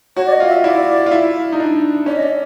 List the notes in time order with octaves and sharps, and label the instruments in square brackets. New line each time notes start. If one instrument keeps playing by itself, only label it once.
[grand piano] F#4 [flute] C#5
[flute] D5
D#5
[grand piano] F4
[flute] E5
[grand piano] E4 [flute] D5
[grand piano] F4
E4
D#4
D4
[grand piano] C#4 [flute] D5
[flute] D#5
D5